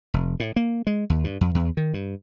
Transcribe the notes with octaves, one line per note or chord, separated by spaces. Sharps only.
F1
A2
A#3
G#3
D#2
G2
F2
E2
D#3
G2